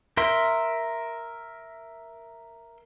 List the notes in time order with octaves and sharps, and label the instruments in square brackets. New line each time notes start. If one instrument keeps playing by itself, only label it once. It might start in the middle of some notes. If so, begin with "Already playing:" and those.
[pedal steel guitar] A#4 E5 C6